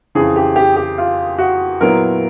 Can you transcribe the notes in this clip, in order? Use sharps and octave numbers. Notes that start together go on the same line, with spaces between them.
F2 C#3 E3 G#4
G4
G4
G4
F4
F#4
A#2 F#3 B3 E4 A#4